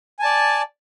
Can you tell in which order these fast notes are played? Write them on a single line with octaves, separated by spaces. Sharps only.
G#5 A5 D5